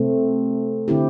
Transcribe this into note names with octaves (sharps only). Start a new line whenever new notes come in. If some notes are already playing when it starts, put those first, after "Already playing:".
Already playing: C3 A3 C4
D3 C4 E4 G4